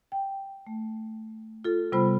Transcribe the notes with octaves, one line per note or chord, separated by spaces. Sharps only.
G5
A3
F4 A4
C3 G3 B3 F4 C5 B5